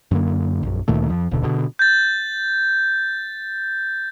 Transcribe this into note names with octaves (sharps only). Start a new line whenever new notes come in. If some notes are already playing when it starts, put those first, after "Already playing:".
F#2 D3 A#3
A#1 F#2
D2 A#2 D#3 A3
F2 F3
F1 D#2 B2 D3
B2 D3
G6 A6